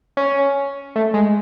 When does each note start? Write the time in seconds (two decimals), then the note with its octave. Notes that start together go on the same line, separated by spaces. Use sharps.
0.17 C#4
0.96 A3
1.14 G#3